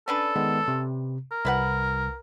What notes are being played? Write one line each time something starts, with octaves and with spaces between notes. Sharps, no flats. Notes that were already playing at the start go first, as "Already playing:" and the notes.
C#4 D4 A4 B4
D#3 G#3 B3
C3
A#4
C2 E4 B4 F#5